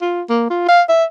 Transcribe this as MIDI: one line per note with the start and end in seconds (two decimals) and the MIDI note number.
0.01 0.22 65
0.29 0.48 58
0.50 0.66 65
0.68 0.82 77
0.89 1.04 76